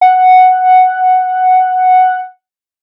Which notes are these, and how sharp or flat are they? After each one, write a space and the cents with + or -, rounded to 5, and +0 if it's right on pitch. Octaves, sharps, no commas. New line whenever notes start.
F#5 +0